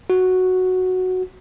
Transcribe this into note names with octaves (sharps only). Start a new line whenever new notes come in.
F#4